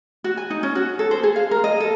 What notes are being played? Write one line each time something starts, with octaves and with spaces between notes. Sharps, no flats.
F#4
G#5
D#4
C#4
F#4
A4
C5
G#4
F5
A#4
D#5
A4